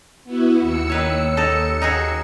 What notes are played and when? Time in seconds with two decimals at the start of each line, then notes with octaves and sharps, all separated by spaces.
0.24 B3 E4 F#4
0.59 D#2 E6 C#7
0.89 D#3 B4 C#5
1.37 D#4 A4
1.82 D#4 F#4 G#4